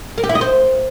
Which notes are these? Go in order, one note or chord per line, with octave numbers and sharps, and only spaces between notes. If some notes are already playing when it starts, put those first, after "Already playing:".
A#4
G4
E4
D#5
C5